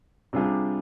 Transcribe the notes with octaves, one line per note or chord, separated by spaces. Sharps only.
C3 G3 D4 F4 G#4